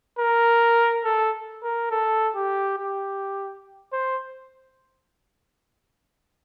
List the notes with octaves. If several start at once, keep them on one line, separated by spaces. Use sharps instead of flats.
A#4
A4
A#4
A4
G4
G4
C5